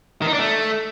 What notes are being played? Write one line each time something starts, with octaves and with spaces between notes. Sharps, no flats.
D#3
D#4
D4
A3